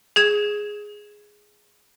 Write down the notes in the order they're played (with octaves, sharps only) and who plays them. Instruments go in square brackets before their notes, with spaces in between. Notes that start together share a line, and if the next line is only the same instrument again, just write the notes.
[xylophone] G#4 G#6 E7